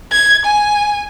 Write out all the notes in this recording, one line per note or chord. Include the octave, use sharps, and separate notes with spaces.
G#6
G#5